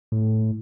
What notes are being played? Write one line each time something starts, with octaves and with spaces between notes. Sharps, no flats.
A2